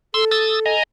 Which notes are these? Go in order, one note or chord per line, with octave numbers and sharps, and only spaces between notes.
A4 C6 E6
D#6 E6 A6
D#5 G#5 A#5